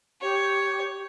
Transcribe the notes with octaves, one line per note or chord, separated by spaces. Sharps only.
G4 C#5